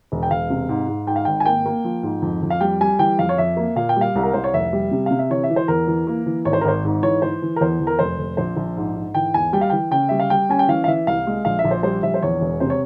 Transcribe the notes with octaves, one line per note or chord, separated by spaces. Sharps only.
E1
G5
E1 F5
C3
G#2
G#2
G#2 G5
F5
G#1 G5
G#5
A#3 G5
A#3
F3
G#2
F2
F2
F5
G3 G5
G3 G#5
E3 G5
F2 F5
C#5
F2 E5
A#3
A#2 F5
G5
G3 F5
C2
A#4
C2 C5
C#5
F1 E5
G3
C3
C3 F5
E5
E3 C#5
E5
E3
C5
E2 A#4
E3
A#3
E3
G#1 C#5
C5
A#4
G#1 C5
G#2
E3 C#5
E3 C5
E3
A#4
E2 C5
E2
A#4
F1 C5
F1
A#1 C5
A#1
G#2
G#2
E3 G5
E2 G#5
G3 G5
F5
E3 G5
C#3 G5
G3 E5
F5
G3 G5
C#4 G#5
G5
E3 F5
F5
E3 E5
C2 F5
G#3
A#1 F5
E5
A#1
C5
G3 C5
A#1 E5
C5
E2 C#5
E1
C3 C5
C#5